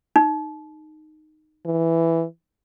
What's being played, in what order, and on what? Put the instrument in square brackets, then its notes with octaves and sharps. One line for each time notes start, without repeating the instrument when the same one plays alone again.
[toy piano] D#4
[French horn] E3